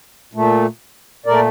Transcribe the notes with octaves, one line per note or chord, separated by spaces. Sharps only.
A#2 A3
A#2 A3 A#4 D5